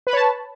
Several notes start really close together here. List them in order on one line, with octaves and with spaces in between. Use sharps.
B4 B5 C#5 A5